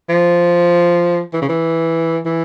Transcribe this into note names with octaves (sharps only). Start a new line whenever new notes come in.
F3
E3
C#3
E3
E3